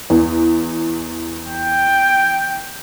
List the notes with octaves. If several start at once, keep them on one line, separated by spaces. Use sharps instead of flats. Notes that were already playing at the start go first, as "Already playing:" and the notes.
E2
G5